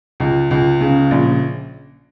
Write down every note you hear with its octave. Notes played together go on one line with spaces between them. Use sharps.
C#2
C#2
C#3
A#1